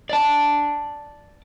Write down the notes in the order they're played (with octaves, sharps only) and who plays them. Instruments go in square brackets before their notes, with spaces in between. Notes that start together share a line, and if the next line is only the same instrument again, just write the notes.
[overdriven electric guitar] D5 A5